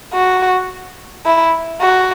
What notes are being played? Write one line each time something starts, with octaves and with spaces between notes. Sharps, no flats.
F#4
E4
F#4